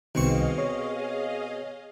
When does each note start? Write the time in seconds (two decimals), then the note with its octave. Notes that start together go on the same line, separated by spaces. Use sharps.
0.15 C2 B2 D#3 C4 G#4 D#5 F5 C#6
0.58 C#5